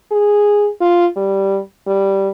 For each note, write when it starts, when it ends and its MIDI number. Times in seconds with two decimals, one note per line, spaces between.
0.12 0.69 68
0.81 1.06 65
1.16 1.60 55
1.87 2.29 55